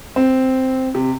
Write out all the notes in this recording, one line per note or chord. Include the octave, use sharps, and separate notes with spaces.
C4
C3